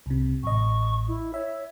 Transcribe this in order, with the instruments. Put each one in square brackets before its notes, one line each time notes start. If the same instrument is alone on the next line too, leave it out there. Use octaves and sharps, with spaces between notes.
[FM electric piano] C2 C3
[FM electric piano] A1 D#5 [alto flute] C#6
[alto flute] E4
[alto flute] C#5 [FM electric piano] E5